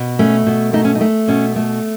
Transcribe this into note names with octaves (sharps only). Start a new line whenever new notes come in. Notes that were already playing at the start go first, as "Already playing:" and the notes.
Already playing: B2
A3 C#4
B2
A3 D#4
C#4
D#4
A3
B2 C#4
A3